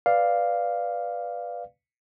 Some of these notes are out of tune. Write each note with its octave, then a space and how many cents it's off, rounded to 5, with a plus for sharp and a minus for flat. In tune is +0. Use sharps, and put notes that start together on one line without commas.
B4 +0 D5 +0 F5 +0